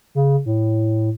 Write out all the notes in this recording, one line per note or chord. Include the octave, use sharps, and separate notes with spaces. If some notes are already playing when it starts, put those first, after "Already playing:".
C#3
A2